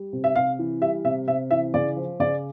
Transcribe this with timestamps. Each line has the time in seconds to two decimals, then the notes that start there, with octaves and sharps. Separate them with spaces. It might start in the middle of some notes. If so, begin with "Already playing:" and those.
Already playing: G3
0.13 C3
0.24 E5
0.36 C3 F5
0.59 E3
0.81 G3 E5
1.05 C3 E5
1.28 C3 E5
1.51 E3 E5
1.74 C#3 D5
1.96 F3
2.20 C#3 D5